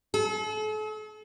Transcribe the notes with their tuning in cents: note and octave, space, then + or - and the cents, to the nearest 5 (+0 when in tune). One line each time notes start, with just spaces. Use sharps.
A4 -45